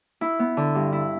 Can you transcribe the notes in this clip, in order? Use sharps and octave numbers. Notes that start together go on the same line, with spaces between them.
E4
B3
D3
G2
E4